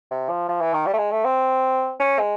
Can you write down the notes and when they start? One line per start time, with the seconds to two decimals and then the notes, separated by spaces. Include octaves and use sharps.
0.11 C3
0.29 F3
0.48 F3
0.61 E3
0.73 D#3
0.86 G3
0.94 A3
0.98 G#3
1.11 A3
1.25 C4
2.00 C#4
2.19 G#3